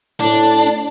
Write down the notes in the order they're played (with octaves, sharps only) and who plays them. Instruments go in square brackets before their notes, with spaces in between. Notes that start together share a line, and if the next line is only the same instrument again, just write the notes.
[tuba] A2 [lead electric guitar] D4